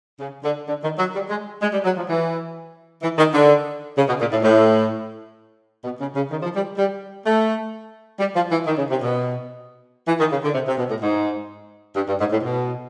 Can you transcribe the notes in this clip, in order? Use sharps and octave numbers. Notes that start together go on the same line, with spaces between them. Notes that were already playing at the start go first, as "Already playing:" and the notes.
C#3
D3
D3
D#3
F#3
G3
G#3
G#3
G3
F#3
F3
E3
E3
D#3
D3
C#3
B2
A#2
A2
A2
B2
C#3
C#3
D#3
F3
G3
G3
A3
G3
F3
E3
D#3
C#3
C3
B2
E3
D#3
C#3
D3
C3
C3
B2
A2
G#2
G2
G2
G#2
A2
B2